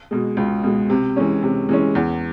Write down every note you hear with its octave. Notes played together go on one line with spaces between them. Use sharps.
B2 G#3
C#2
B2 G#3
C3
E3 G#3 C#4
C3
E3 G#3 C#4
E2